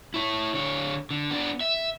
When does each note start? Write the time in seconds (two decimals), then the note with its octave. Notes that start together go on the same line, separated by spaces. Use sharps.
0.14 E4 C#5
0.54 D3 C#5
1.11 D3
1.31 B3 D4
1.61 E5